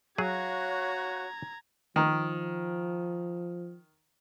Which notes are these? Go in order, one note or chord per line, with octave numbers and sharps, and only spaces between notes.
F#3 F#4 G#4 C#5 F5 A#5 F#6 G#6
D#3 F3